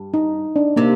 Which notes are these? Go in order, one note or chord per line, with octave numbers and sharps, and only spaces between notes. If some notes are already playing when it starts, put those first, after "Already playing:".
Already playing: G2
D#4
D4
C3 A#3